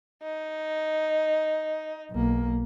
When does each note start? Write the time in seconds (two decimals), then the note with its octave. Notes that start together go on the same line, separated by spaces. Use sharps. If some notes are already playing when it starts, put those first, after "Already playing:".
0.22 D#4
2.11 B1 A#3